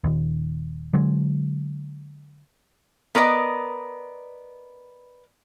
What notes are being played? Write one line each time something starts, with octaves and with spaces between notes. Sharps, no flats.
D#1 D#2
D3 F#3 G#3
B3 A#4 C5 D5 D#5